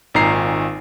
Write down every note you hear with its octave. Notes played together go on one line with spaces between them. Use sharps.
G#1 A#2 D#3 A#5 C7